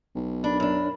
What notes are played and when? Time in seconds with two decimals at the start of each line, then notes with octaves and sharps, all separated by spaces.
0.15 B1
0.44 D4 A#4 B5
0.60 F#2 D4